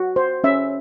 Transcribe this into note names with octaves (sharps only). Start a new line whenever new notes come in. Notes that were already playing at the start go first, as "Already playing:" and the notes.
Already playing: F#4
C5
C#4 E5